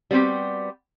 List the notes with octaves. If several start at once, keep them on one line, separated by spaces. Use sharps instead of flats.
G3 B3 C4 F#4 G4